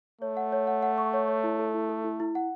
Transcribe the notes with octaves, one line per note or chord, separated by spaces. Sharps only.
A3 C#5
F#5
C#5
F#5
F#5
C#6
C#5
C#5
E4
A4
E4
A4
E4
E4
F#5